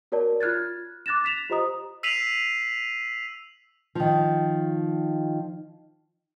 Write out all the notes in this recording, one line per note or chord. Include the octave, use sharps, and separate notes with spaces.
F#4 A#4 C#5 D5 A5
F4 F6 F#6 G#6 A6
D6 F#6 A6 A#6 E7
A6 B6 E7 F7
F4 G4 C5 D#5 A#5 D#6
E6 B6 C7 D#7 F7 F#7
D#3 F3